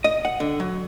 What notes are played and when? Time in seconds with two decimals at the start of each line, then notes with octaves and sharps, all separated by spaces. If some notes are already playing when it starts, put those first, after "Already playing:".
0.04 D#5
0.25 F#5
0.40 D3
0.60 F#3